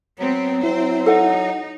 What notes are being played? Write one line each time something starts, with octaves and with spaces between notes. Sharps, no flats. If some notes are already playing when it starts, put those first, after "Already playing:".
F#3 B3 C4
C4 E4 C5
D#4 A4 F#5